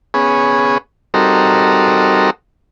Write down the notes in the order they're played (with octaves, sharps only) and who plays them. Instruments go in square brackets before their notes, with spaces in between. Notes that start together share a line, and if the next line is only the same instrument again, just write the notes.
[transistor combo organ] B3 C#4 G#4
G3 C4 D#4 F#4 A4 A#4